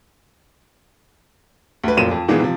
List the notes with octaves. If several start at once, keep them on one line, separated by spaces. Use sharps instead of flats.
D2 B4
F1 F#2 A#2 D#7 E7
F2
A#2 D#3 E3 G#3 A#3 B3
C3 F3